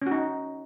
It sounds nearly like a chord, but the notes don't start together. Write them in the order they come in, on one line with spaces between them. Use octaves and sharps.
C#4 F#4 D#4